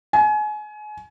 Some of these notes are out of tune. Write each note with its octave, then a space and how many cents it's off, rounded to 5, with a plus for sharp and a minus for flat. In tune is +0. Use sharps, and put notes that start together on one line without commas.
G#5 +30